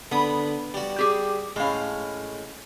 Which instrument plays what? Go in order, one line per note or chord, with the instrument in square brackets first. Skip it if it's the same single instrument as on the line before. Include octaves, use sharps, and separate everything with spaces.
[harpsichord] D3 D#6 [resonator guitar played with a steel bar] B3
[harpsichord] G3 F#4
[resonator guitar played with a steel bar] G4 G#4
[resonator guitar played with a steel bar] A2 F5 [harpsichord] G#3 C#4